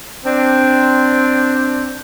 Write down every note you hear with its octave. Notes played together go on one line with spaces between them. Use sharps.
C4 D4